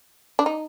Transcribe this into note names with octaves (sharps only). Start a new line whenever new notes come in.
D4
D#4